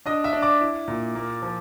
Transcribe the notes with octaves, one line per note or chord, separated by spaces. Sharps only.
D4 D#5 D#6
E5 E6
D4
D5 D6
E4
A#2
A#3
F3